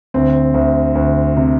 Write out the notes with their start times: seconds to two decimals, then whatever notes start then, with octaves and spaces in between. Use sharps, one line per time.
0.14 D2 C4
0.54 D2
0.95 D2
1.36 C3